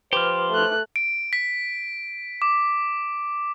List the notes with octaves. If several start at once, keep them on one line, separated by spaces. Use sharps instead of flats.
F3 G4 B4 C5 D6 F6
A3 F#6
D7
B6
D6